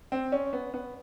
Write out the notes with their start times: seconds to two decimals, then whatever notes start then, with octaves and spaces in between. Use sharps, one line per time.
0.12 C4
0.32 C#4
0.53 B3
0.74 B3